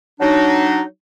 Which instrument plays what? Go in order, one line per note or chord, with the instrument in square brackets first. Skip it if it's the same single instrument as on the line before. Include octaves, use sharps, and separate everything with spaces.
[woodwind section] F#3 D4 D#4